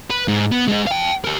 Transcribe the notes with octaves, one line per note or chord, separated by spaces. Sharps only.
B4
G#2
B3
G#3 D#4
F5 G5
G4 A#4